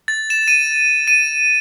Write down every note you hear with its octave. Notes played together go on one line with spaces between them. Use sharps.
A6
E7
D#7
D#7